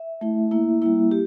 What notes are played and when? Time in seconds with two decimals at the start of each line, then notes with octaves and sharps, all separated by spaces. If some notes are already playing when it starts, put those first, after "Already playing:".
Already playing: E5
0.21 A3 E4
0.51 A#3 E4
0.82 G3 A#3 E4
1.11 G4